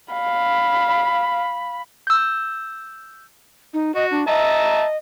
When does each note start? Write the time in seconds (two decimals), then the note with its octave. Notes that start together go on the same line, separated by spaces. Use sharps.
0.13 F5 B5
2.07 E6 G6
3.74 D#4
3.95 F#4 D#5
4.11 D4
4.28 D#5 E5 A5 A#5